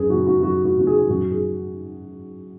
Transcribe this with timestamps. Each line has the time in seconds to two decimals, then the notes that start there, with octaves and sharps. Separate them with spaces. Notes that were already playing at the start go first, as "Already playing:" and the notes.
Already playing: F#2 G#4 B4
0.10 C#3 B3 F#4
0.27 F#4
0.43 F#2 F#4
0.65 F#4
0.76 C#3 B3 F#4
0.87 G#4
1.09 F#2 F#4
1.31 G#4